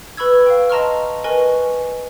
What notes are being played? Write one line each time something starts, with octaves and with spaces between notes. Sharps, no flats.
B4 B5 C#6 E6 G#6
F5 G5
D#5 A5 A#5 C6 C#6 F6
A#4 B4 D#5 G#5 C#6